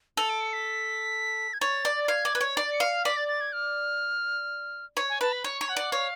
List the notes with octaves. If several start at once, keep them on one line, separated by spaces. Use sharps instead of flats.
A4 F7
D7
C#7
B6
G#6
C#5 A6
D5
A6
F5 G#6
D5
B4
C#5
D5 A6
C#7
F5
D5 B6
A6
A6
G#6
F6
C#5
G#5
B4 A5
B5
C#5 C#6
C#5
F#5
D5
C#5 F5